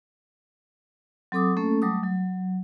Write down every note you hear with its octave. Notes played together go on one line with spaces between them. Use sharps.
F#3 C4 A4 D6 D#6
A3 A#3 C#4 A4
F#3 G3 A3 D6 D#6
F#3